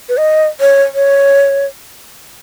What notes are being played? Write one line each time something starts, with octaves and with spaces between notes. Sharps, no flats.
B4
D#5
C#5
C#5